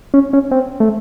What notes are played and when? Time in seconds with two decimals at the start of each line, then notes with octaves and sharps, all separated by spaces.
0.14 C#4
0.33 C#4
0.51 C4
0.80 A3